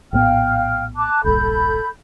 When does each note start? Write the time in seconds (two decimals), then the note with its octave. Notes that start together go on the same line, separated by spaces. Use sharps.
0.13 A#1 A2 B3 F5 G5 F6
0.96 A5 D6 F#6
1.24 D1 A#1 G2 A4 B5 G6